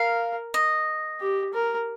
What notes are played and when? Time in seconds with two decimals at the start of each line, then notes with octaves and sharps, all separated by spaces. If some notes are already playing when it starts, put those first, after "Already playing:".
Already playing: A#4 F5
0.54 D#5
1.20 G4
1.53 A#4